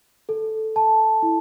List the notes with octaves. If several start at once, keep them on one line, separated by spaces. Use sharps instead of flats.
A4
A5
E4